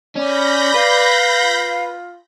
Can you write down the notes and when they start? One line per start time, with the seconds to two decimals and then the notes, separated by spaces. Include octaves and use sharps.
0.16 C#4 D5 B5 G6 A#6
0.74 B4 F5
1.41 F4